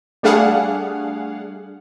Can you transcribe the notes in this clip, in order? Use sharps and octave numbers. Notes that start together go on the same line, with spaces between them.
G3 A3 D4 G#4 F5 F#5